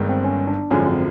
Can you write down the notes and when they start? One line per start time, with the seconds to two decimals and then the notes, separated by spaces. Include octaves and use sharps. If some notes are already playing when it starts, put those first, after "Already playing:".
Already playing: G1 G2 D#3 G#3
0.09 C4
0.24 C#4
0.47 D4
0.70 G#1 F#2 D3 F3 G#3 C#4
0.87 C4